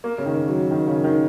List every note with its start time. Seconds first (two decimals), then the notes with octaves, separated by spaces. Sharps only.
0.04 A#3
0.18 C#3
0.26 D#3
0.48 F#3
0.71 D#3
0.88 C#3
1.04 D#3